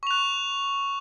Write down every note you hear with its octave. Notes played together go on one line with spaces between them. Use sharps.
C#6 F#6 F7